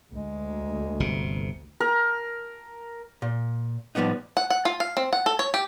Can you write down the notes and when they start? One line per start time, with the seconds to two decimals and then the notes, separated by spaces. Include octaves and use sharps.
0.13 D2 G#3
1.00 G1 C3
1.80 A#4
3.22 A#2
3.95 A2 F3 G3 B3 D#4
4.37 F#5
4.50 F#5
4.65 F4
4.80 F5
4.97 C4
5.13 F#5
5.26 A4
5.39 C#5
5.54 G4